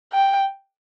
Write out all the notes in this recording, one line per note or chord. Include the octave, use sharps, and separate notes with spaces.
G5